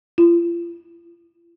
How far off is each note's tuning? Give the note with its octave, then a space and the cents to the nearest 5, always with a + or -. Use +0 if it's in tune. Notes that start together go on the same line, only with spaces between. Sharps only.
F4 -40